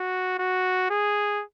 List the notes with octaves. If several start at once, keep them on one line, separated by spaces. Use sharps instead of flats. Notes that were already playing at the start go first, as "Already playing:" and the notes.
Already playing: F#4
F#4
G#4